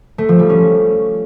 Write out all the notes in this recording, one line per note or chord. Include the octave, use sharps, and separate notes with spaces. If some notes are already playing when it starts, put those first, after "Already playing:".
A3
F3
G3
C#4